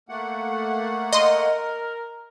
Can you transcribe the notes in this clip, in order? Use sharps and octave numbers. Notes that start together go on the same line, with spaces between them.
A3 A#3 F#5
A#4 D#5 C6